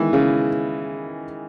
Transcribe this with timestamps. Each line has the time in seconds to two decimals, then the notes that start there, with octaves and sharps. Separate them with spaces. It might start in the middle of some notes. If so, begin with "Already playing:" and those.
Already playing: D#3 E3 G#3 B3 E4
0.13 C#3